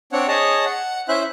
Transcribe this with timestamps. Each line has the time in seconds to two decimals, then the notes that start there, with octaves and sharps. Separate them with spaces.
0.12 C4 D4 C#5 F#5
0.28 G#4 C#5 D#5 A5
0.65 F#5
1.08 C#4 E4 C5 E5 F#6